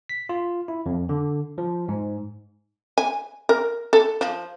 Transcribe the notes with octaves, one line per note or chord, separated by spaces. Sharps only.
B6
F4
E4
F2
D3
F3
G#2
G#5
A#4
A4
F3